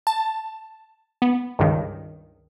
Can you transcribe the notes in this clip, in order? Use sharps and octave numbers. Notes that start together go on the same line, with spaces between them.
A5
B3
C#2 G2 D#3